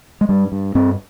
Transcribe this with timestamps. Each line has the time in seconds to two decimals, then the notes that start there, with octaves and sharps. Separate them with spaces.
0.21 G#3
0.29 G2 G3
0.52 G2
0.75 G2 C4